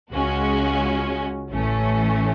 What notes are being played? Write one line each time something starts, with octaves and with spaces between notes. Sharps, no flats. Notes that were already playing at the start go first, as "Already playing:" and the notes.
C#2 C#3 G#3 C#4 F#4
A1 A2 E3 A3 C#4